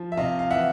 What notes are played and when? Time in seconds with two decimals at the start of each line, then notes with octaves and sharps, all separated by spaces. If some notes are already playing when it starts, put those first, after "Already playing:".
Already playing: F3
0.12 E5
0.17 C3 D#5 F5
0.39 F5
0.50 E3 E5 F#5